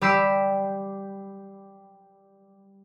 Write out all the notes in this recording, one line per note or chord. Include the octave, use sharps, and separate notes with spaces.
G3 G4 B5 E6 C7 D7